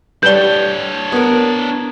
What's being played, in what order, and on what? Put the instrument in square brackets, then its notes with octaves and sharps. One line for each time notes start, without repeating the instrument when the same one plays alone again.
[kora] G3 A4 B4 [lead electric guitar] D4 C#5 [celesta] G6 G7
[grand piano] B3 A#4